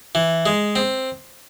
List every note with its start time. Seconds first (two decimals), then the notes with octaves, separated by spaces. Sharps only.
0.15 E3
0.46 G#3
0.76 C4